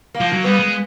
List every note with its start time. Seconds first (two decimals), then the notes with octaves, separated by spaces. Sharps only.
0.15 A#3
0.21 F3
0.33 F#3
0.44 G3 B3
0.60 G#3